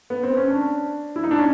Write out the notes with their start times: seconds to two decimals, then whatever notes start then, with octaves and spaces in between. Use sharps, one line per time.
0.10 B3
0.23 C4
0.37 C#4
0.50 D4
1.16 E4
1.24 D#4
1.31 D4
1.39 C#4